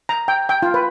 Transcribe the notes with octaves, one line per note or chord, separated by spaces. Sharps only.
A#5
G5
G5
F4
B4